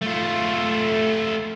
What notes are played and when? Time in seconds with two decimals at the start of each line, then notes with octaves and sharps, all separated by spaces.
0.02 A3 F4